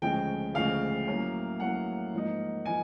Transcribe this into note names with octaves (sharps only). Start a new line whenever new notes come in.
D2 C#3 F3 G#3 G5
D2 C#3 F3 G#3 F5
A2 F#3 A#3 C#4
A2 F#3 A#3 C#4 F#5
G#2 F3 A#3 D#4
F3 A#3 D#4 G#5